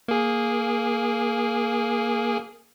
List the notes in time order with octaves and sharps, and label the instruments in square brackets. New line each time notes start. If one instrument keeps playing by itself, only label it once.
[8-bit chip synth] A#3 G#4